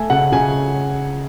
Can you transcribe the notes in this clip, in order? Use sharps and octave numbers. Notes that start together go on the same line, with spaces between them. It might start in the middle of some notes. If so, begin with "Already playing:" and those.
Already playing: A3 G#5
C#3 F#5
C#3 G#5